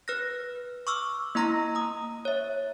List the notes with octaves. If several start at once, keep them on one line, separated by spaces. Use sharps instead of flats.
B4 F6 F#6 A#6
C#6 D6 E6 F6
A#3 E4 D#5 A#5 C6 A#6
A#5 D#6
C#5 E5